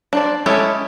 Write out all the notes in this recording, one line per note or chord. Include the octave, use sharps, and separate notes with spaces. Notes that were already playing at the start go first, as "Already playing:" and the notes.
D4 C5 D5
G#3 C#4 E4 G4 A4